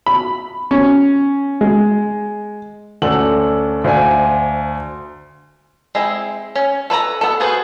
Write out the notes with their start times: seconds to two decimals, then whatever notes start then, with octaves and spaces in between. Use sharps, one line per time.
0.06 B5
0.71 C#4
1.61 G#3
3.02 D2 C#4 D4 A4 F#5 F#7
3.84 D2 C5 D5 F5 G#5
5.95 G#3 C4 E4
6.56 C#4
6.90 A4 B4 C#5 A#5
7.21 B3 A4
7.40 F4 F#4 G#4 B4 C5